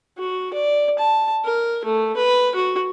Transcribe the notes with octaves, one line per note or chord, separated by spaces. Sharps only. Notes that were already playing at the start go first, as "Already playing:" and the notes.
F#4
D5
A5
A#4
A3
B4
F#4